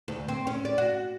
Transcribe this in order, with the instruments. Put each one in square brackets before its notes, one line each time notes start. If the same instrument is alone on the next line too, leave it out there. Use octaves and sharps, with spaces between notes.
[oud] D2
C4
C#4
D5
F#4